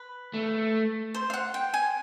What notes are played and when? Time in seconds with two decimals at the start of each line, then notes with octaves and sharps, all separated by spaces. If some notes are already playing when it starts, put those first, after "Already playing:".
Already playing: B4
0.34 A3
1.14 C5
1.30 F5
1.33 F#5
1.54 G5
1.74 G#5